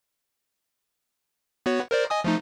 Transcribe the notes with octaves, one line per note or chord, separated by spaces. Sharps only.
B3 F#4 C#5
A#4 C5 D5
D#5 G#5 D#6
F3 A3 D#4